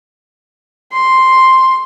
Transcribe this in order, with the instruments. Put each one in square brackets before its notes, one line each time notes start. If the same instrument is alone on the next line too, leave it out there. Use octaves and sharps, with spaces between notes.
[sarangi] C6